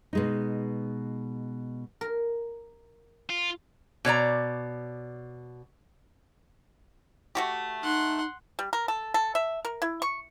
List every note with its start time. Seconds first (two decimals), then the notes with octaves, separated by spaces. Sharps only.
0.13 B2 G#3 D#4
2.01 A#4
3.29 F4
4.05 B2 C#5 D5 A#5
7.35 A3 F#4 G4
7.83 D#4 F#5 C6
8.59 G3
8.73 A#4
8.88 A4
9.14 A4
9.35 E5
9.65 A#4
9.82 E4
10.02 C#6